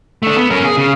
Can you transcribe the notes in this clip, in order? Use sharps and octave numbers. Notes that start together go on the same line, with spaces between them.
A3 D4
B3
C#4 A#4
G#4
C#3